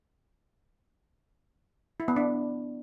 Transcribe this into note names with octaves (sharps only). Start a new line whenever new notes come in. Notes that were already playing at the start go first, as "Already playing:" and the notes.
E4
B3
D4